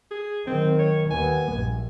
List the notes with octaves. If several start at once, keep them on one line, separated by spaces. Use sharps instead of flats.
G#4
D#3 F#3 C4
C#5
D#2 B3 G#5
A#1 G2